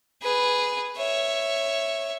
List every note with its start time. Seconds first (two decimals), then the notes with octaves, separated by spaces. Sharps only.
0.22 G#4 B4
0.97 C#5 E5